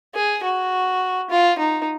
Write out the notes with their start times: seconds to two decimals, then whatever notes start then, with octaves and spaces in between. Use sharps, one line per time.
0.14 G#4
0.43 F#4
1.30 F4
1.58 D#4